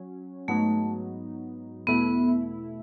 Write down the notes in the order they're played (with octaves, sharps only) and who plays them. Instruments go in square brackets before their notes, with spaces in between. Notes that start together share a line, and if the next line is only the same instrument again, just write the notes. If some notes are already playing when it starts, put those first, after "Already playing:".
Already playing: [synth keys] F#3 C#4
[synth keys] G#2 F#3 B3 D#4 [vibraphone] A3
[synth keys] E2 B2 A3 E4 [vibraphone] B3